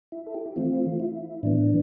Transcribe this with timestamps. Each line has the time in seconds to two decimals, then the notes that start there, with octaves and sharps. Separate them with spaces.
0.12 E4
0.26 A4
0.34 G4
0.46 E4
0.56 E3 A3 C4 F4
1.00 E4
1.43 A2 E3 B3 D4